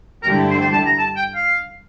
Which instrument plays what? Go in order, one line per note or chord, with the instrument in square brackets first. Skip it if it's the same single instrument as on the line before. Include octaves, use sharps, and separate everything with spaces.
[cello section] G2 D3 A3 E4 G4 [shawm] A#4
[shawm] C5
C5
A5
A#5
A5
G5
F5